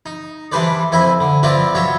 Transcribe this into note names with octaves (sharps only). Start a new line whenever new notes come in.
D#4
E3 G3 D4 B4 C5 D5
F2 E4 C5 G#5 B5
D3
F3 C4 E4 F4 B4 D5
F#3 F4 C#5 E5